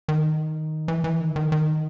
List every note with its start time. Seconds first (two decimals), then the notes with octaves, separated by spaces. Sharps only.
0.09 D#3
0.88 E3
1.04 E3
1.21 D#3
1.36 D#3
1.52 D#3